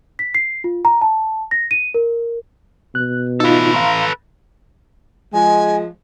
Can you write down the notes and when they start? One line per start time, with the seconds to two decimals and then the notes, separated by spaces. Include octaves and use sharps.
0.19 B6
0.35 C7
0.64 F4
0.85 A#5
1.01 A5
1.51 A#6
1.71 D#7
1.94 A#4
2.95 B2 F#6
3.40 D#4 F4 A4 B4
3.74 F5 A#5 C6
5.33 F3 G#3 G#5